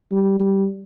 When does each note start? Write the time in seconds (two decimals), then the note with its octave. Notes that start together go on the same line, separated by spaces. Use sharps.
0.12 G3
0.40 G3